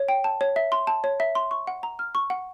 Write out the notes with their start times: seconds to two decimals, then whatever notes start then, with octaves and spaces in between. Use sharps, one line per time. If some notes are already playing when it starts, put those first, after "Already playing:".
Already playing: C#5
0.09 G5
0.24 A5
0.41 C#5
0.56 E5
0.72 C6
0.87 A5
1.04 C#5
1.20 E5
1.35 C6
1.51 C#6
1.67 F#5
1.83 A#5
1.99 F6
2.15 C#6
2.30 F#5